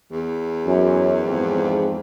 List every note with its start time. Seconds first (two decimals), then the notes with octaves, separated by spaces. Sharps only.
0.12 E2
0.66 F#2
1.25 F2 G#2